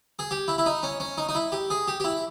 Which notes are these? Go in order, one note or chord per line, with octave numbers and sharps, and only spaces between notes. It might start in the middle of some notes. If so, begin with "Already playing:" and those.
G#4
G4
E4
E4
D#4
C#4
C#4
D#4
D#4
E4
G4
G#4
G4
G4
E4